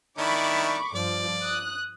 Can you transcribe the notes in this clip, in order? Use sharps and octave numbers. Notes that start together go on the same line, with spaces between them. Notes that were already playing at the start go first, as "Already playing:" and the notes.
D#3 D4 E4 B5 C#6 D6
G2 F3 D5
D#6 F#6